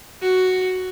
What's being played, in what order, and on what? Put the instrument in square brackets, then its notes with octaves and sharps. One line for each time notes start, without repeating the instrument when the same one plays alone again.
[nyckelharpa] F#4